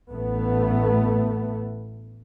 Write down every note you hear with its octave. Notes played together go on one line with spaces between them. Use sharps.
A1 A3 B3